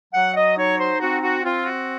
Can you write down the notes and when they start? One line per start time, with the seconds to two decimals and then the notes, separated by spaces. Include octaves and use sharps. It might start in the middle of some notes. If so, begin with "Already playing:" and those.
0.14 F#3 F#5
0.36 D#5
0.57 D#4 C#5
0.79 C5
1.01 C4 F#4
1.22 F#4
1.44 C4 F4
1.65 F#4